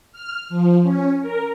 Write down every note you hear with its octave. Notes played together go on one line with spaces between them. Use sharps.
F6
F3
C#4
A#4